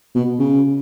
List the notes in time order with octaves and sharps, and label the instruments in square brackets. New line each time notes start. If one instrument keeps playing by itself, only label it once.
[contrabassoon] B2
C#3